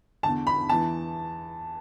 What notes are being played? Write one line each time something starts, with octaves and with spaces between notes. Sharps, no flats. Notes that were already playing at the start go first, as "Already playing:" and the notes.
E2 D3 A5
B5
E2 E3 A5